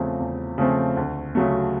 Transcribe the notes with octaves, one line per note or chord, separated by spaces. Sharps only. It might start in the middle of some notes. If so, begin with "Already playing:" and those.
Already playing: E2 C#3 F3 A3 C4
E2
C#3 F3 A3 C4
D2
C#3 F#3 A3